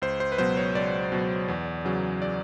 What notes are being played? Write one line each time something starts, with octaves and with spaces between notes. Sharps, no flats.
C#2 C5
C5
B4
B2 F#3 C5
C#5
C#2 D5
B2 F#3
E2
C#3 F#3
D5